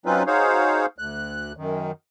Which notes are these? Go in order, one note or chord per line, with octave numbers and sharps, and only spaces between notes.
F#3 C4 C#4 D#4 F4 B4
D#4 F#4 G#4 C5 C#5 F5
D2 F#6
F#2 D#3